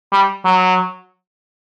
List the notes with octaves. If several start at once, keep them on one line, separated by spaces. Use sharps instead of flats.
G3
F#3